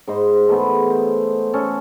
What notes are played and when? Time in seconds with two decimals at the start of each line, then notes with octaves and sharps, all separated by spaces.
0.08 G#2 C5 D#5
0.47 E3 G#3 A3 B3
0.90 C5
1.54 C#4 A4